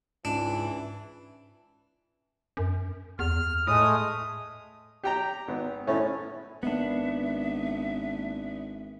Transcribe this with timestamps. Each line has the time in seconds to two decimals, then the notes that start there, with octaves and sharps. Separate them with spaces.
0.25 C#2 G#2 E3 D4
2.57 F#2
3.19 E2 F6
3.67 A2 G#3 A3 D#6
5.03 G4 G5 A#5
5.48 G#1 B3
5.87 G#1 A2 C#4
6.63 G#1 G#3 A#3 B3 D4 E5